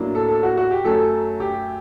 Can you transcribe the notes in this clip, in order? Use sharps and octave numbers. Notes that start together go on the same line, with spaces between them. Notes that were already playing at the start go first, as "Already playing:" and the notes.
Already playing: A2 F#3 A#3 D4
A4
A4
F#4
F#4
G4
F#2 F#3 A3 A4
G4